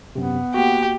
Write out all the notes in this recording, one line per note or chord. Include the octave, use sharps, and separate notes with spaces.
F#2 C3 B3
A#3 F#4 G4